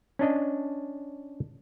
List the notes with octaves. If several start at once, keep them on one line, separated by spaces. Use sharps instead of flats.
C#4 D4 D#5